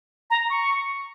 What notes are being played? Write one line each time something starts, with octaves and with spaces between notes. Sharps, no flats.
A#5
C#6